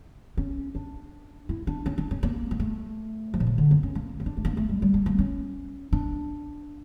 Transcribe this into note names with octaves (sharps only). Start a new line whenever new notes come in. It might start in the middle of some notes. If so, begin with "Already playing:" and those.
C#4
D4
E4
D4
C#4
D4
C#4
A#3
A#3
A3
F3
A#2
C#3
D3
A#3
C#4
A#3
C#4
D4
A3
A#3
A3
G3
G3
A#3
A#3
C#4
D4